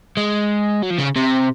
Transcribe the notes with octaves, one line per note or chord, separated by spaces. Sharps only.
G#3
F#3
F3
C#3
C3